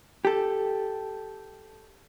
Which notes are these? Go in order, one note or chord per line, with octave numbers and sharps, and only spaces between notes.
G4 A4